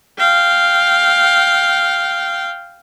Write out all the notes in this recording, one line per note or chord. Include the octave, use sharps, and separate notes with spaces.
F5 G5